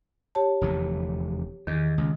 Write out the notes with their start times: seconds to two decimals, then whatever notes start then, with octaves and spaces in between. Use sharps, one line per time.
0.35 G4 C#5 A5
0.61 F1 E2 D3
1.67 E2 D#3
1.98 C#2